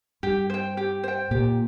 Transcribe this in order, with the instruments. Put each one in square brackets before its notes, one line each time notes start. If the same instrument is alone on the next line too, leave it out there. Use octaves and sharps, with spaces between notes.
[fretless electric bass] G2 [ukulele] G4
[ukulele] C5 G5
G4
C5 G5
[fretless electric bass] A#2 [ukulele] G4